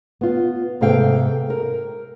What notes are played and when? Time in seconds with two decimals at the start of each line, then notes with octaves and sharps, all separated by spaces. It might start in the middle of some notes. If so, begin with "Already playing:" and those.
0.21 B3 F4
0.81 G#2 C3 B3 A4 F5 G5
1.50 A#4